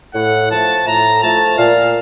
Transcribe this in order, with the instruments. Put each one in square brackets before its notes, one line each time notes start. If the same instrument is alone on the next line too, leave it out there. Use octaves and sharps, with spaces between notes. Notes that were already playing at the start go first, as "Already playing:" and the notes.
[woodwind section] A2 [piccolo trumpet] F#5
[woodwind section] F3 A3 [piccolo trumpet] A5
[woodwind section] A2 [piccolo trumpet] A#5
[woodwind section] F3 A3 [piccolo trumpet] A5
[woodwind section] A#2 [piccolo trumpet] F5